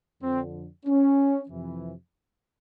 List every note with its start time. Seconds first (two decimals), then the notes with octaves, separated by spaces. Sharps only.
0.22 F2 D3 C4
0.86 C#4
1.49 F2 C3 E3